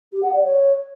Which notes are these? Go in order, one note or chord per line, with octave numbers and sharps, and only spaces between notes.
G4
F#5
D5
C#5